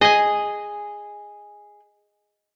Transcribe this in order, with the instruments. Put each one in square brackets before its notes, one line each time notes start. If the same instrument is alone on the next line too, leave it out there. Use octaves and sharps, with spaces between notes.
[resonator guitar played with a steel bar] G#4 [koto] D#5 G#5